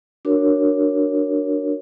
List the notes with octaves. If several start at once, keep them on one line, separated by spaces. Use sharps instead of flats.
D4 F#4 A#4 C#5